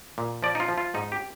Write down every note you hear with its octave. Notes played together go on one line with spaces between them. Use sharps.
A#2
F3 D5
D#4
F4
F3
F4
G#2 D#4
G4